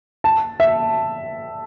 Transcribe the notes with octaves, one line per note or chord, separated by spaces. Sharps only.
A5
E5